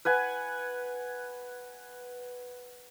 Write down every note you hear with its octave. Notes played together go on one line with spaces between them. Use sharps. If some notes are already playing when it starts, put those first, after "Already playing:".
B4 F#5 G#5